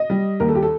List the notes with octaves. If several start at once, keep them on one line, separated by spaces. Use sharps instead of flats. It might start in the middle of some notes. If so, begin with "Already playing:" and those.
Already playing: D#5
G3
D#2 A#4
A4
G4
A4